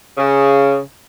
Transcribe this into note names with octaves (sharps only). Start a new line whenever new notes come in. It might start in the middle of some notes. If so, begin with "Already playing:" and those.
C#3